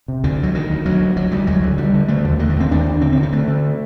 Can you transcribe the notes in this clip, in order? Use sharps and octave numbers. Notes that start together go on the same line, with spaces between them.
C3
D2 D3
D2
F#3
D2 D#3
D2
D2 F#3
D2
D2 F#3
D2 G3
D2 F#3
D3
D3 G3
D3
D3 A3
D#2
D3 A#3
A3
D#2 C4
D#2 D4
D#2
D3 C4
C4
D3
C4
D3 A3
D3